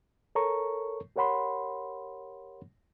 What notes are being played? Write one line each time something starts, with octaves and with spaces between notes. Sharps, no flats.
A4 A#4 C#5 A#5 C#6
G4 A#4 C#5 F#5 B5 C6